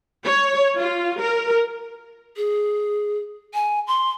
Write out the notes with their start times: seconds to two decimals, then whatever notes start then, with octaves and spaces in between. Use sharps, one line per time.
0.25 C#5
0.78 F4
1.21 A#4
2.37 G#4
3.54 G#5
3.87 C6